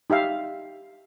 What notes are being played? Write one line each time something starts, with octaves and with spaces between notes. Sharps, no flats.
D#4 G4 E5 F5